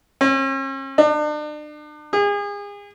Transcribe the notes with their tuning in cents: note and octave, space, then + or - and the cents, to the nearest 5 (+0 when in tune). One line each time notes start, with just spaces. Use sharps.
C#4 -45
D4 +40
G#4 -35